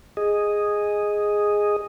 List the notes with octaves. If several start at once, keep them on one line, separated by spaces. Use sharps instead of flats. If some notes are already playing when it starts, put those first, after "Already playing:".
G#4 D#5